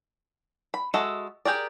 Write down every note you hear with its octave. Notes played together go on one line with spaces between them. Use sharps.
B5
G#3 F#4 A4 D#5 E5
G4 G#4 A#4 D5